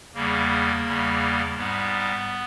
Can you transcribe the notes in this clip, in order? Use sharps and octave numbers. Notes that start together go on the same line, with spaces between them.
E2 C#3 G3 A#3
E2 C#3 G3
G#2 G3 B3